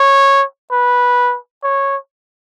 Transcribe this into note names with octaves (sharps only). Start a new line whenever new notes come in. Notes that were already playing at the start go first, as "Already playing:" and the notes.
Already playing: C#5
B4
C#5